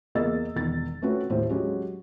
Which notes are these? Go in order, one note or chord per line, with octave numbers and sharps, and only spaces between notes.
E2 A#3 G#4 D#5 E6 A6
E1 E2 D#3 A6
A3 C4 C#4 F#4 B4
D#2 A2 C5
F#3 G#3 C#4 F#4 G4